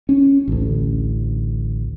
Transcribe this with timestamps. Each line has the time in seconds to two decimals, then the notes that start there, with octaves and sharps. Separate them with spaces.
0.09 C#4
0.48 A1 D2